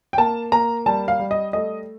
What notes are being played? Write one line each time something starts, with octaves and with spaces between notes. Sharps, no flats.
G5
A#3 A5
A#3 A#5
G3 A5
F5
G3
D#5
A3 D#5